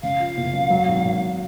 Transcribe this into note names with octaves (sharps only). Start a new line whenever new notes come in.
C#3 F5
F3
F#1
F#2
F#3
G#1
G#1